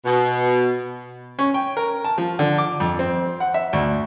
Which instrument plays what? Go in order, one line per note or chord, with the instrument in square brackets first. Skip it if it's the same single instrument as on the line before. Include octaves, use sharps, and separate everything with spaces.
[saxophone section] B2
[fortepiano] C#4
G5
A#4
A5
F3
D3
D6
F2
C4
F#5
E5
D2